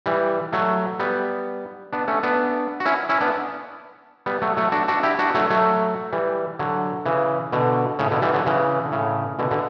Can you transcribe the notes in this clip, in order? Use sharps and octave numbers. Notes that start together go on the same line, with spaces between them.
E3 G3
F#3 A3
G3 B3
B3 D4
A3 C#4
B3 D4
F#4
C#4 E4
C#4 E4
B3 D4
G3 B3
F#3 A3
F#3 A3
D4 F#4
D4 F#4
E4 G4
D4 F#4
F#3 A3
F#3 A3
E3 G3
D3 F#3
C#3 E3
B2 D3
A2 C#3
B2 D3
E3 G3
D3 F#3
C#3 E3
D3
A2 C#3
B2 D3
B2 D3